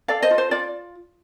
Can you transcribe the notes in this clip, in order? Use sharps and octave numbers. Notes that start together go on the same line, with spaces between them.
A4 D5 F5
C5 D#5
F4
C5
F4 D5